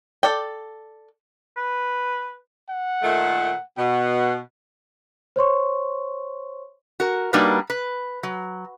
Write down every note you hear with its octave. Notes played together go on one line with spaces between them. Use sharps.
A4 D5 G5
B4
F#5
A#2 D#3 A3
B2 F#5
C5 C#5 C6 C#6
F#4 A#4
G3 A#3 D4 D#4 F#4 B4
B4
F#3